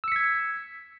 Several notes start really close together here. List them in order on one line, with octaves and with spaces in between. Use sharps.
E6 C#7 B6 G#6